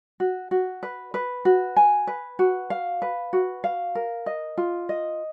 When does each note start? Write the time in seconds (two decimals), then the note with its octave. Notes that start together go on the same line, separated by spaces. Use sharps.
0.20 F#4
0.51 F#4
0.83 B4
1.14 B4
1.45 F#4
1.76 G#5
2.07 B4
2.39 F#4
2.70 F5
3.02 B4
3.33 F#4
3.64 F5
3.95 A#4
4.26 D#5
4.57 F4
4.89 D#5